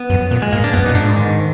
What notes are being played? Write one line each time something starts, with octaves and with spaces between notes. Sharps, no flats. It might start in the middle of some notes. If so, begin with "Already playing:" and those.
Already playing: B3
F#2
A#2
G#3
G#2 A#3
D4
F#2 B3
A#2 D#4
G#2 D4
D#3